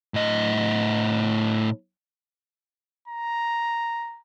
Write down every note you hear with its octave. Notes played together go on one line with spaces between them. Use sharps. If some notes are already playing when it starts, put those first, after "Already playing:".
A2 D#5
A#5